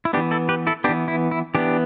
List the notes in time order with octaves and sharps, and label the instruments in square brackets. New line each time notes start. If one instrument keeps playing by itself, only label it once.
[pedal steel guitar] E4
B3 D4 G4
E3
E4 A4
G4 B4
E4 A4
B3 D4 G4
E3
E4
E4
E3 B3 D4 G4